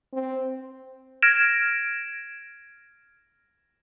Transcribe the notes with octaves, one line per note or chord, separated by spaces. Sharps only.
C4
F6 G#6 A#6 D7 E7